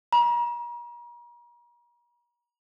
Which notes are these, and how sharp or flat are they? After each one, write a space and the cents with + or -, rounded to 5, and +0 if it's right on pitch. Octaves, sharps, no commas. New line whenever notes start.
A#5 +40